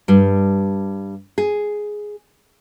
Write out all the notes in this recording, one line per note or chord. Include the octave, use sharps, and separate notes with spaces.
G2 G3
G#4